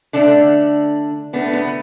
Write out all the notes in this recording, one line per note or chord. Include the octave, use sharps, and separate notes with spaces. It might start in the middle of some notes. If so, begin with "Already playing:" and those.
D3 A3 D4
D3 A3 B3
B3